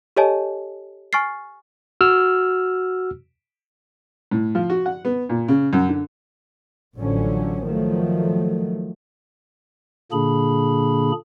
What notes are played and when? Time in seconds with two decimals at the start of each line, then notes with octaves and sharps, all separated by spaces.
0.17 G4 A4 C#5 D#5 G#5 A5
1.13 G#5 C#6 F6 A6 C7
2.01 F#4 E6 F6
4.31 A2
4.55 F3
4.70 F#4
4.86 F#5
5.05 B3
5.29 A#2
5.48 C#3
5.73 F#2
5.89 D3
6.97 A1 A2 D3 F3 F#3 C#4
7.63 D#3 F3 F#3 A3
10.12 A#2 D3 A#3 D4 G#4 B5